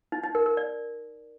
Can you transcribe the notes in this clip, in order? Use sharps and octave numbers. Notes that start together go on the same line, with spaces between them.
D#4
D#4
A#4
A#4
D5